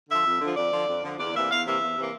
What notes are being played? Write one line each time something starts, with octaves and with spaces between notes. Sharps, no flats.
D3 F3 E5
F2
D3 F3
F2 D5
D3 F3
F2
D3 F3
E2 D5
C3 E3 A#3 E5
E2 F5
C3 E3 A#3 E5
E2
C3 E3 A#3